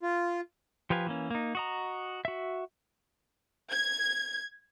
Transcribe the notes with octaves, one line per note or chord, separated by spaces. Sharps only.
F4
F3 G4 B4 F5 G#5
E3 A#3 C#4
A#3 D#4
F#4 D#5 A#5
F#4 E5
G#6